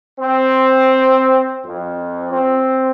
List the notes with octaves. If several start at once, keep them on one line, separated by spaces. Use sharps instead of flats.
C4
F2
C4